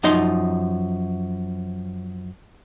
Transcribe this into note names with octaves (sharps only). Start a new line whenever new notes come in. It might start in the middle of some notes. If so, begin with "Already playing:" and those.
F#2 F3 D#4 D#5 C6